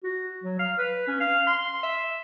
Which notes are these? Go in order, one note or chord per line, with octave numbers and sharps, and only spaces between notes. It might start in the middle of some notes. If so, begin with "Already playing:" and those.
F#4
F#3
F5
B4
C#4
F5
C6
E5